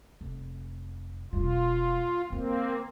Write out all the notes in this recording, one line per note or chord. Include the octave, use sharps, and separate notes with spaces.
F1
E1 G3 F4
D3 G#3 A#3 C4